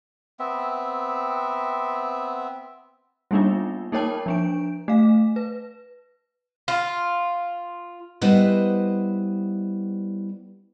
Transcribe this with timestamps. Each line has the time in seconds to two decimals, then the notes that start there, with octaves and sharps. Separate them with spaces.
0.39 B3 C4 E5
3.31 G3 A#3 B3 D4 D#4 F4
3.92 A#3 D#4 A#4 C#5 G5 A5
4.26 F3 D4 D7
4.88 A3 F5
5.36 B4
6.68 F4
8.21 G3 B3 E4 B4 C5 D#5